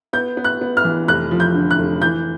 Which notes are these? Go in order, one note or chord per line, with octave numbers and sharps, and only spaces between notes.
B3 G6
B3
F#6
B3
F6
E3
F1 F#6
F3
G6
D3
F#6
F1
E3 G6